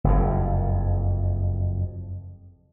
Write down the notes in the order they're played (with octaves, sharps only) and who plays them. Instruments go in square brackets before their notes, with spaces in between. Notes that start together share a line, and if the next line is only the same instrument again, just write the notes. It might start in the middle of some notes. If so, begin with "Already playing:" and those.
[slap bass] F#1 F2